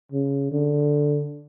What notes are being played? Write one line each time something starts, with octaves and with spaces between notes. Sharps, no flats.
C#3
D3